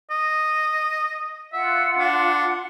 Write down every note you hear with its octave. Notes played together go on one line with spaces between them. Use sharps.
D#5
F4 E5 F#5
D4